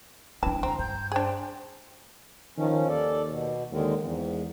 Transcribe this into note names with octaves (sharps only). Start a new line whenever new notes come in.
E3 C#4 D4 G5 A5
D2 C4 A#5
G2 G6
D4 G#4 C5 G5
D#3 F3 C#4
D#2 A4 D5
B2
D#2 D3 D#3 G#3
E2 G#2